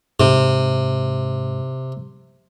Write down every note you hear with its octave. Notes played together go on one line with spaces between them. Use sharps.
G#2 C3